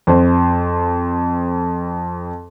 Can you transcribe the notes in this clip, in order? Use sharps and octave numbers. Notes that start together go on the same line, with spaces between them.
F2 C5